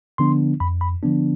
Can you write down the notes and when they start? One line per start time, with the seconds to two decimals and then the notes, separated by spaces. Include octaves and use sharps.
0.18 D3 F3 B3 D4 C6
0.60 F2 B5
0.81 B5
1.03 D3 F3 B3 D4